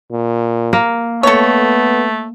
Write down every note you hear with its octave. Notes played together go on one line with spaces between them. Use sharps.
A#2
A#3
A3 B3 A4 C#5